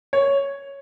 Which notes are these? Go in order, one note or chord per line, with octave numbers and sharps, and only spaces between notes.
C#5